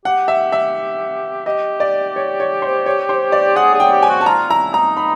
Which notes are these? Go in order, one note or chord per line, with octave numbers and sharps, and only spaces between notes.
G4 F#5
E5
E5
G4 D#5
D5
C#5
C#5
C5
C#5
C5
D5
G#4 F#5
G#4
G5
G4
G#5
F#4
A5
F4 A#5
E4 A#5
D#4 A#5
B5